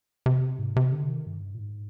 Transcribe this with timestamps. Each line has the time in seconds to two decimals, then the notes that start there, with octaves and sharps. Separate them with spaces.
0.26 C3
0.59 G#2
0.76 C3
0.92 D3
1.09 D#3
1.27 G2
1.55 A#2
1.59 G#2